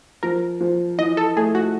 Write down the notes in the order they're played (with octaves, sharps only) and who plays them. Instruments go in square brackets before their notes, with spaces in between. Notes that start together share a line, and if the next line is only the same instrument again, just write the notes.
[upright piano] F3 [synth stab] A#4
[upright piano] F3
[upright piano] E3 [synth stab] D#5
[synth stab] A4
[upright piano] A3 [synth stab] G#4
[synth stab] F#4